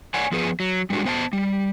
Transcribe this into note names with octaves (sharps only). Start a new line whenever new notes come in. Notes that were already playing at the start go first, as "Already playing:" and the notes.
C#5 D5 F#5 G#5
F3 B3 G#4 B4
F#3
G3 G#3 D4 F#4
B3 C5 F#5 A5
G3